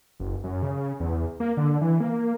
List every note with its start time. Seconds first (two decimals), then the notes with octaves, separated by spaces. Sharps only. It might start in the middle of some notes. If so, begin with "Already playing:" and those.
0.20 F#1
0.44 F#2
0.62 C#3
1.00 E2
1.40 A#3
1.57 D3
1.81 E3
2.00 A#3